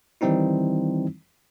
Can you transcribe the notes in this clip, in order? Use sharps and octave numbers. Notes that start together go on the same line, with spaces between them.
D#3 E3 G3 C4 D#4 E4